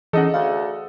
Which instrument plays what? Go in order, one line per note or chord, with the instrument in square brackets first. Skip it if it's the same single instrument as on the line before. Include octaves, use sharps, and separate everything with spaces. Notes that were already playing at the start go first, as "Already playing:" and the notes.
[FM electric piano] E3 C#4 [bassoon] D#4 [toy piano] G#4 [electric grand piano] A4 D#5 F#5
[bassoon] D2 [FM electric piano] F5